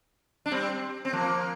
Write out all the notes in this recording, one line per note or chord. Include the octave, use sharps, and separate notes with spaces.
D4
G3 C4
C4
F3 A#3